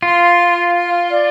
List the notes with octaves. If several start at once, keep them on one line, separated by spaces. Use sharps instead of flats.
F4 C6
F5
C6
D5